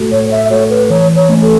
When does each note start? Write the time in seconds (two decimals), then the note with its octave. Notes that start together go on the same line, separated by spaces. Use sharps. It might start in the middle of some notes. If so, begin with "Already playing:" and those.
Already playing: A2 A3 F#4 A4
0.11 A2 C#5
0.31 E5
0.50 A3 F#4 A4 C#5
0.70 B4
0.90 E3 C#5
1.16 C#5
1.29 A3 C#4
1.42 A4